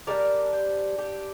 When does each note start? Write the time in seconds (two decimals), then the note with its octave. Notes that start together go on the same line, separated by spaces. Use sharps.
0.07 D3 G3 D4 A#4 D5
0.53 G4 C5
0.98 G4